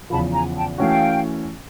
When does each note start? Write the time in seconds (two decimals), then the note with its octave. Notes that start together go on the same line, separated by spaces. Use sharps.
0.10 E2 C#3 F3 A5 B5
0.33 G#5 A#5
0.55 G5 A5
0.78 E3 A3 C#4 F#4 F5 G5